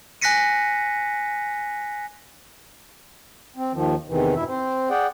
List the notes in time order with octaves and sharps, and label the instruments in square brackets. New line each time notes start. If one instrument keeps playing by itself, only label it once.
[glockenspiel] G#5 F#6 A#6 B6 C#7 D#7
[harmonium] C4
D#2 D#3 F3
E2 C3 D#3 E3
E2 G2 B2 E4 E5
C4 C5
G#4 D5 F#5 G5